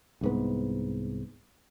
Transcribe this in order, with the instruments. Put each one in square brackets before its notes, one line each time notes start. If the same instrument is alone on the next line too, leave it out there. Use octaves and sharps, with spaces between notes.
[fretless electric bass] C2 G#2 B3